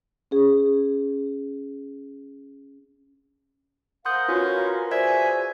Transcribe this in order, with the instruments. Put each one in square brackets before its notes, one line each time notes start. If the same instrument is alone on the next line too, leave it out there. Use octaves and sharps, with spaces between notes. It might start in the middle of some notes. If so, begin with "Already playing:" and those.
[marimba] C#4 G#4
[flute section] A#4 C5 F5 [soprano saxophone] F#5 [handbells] C6 D#6 G6
[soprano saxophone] C#4 [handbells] F4 B4 [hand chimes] F#4
[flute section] F#4 G#4 G#5 [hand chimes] C5 D5 G#6 [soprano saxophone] E5